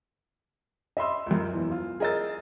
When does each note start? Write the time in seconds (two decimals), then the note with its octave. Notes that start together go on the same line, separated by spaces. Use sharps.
0.97 D#5 E5 B5 C6 E6
1.27 C#2 F#2
1.53 E1 E3
1.71 F4
2.00 G#4 A#4 D#5 E6 A6